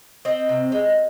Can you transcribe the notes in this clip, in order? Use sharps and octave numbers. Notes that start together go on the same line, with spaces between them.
C4 D#5
C3
G#3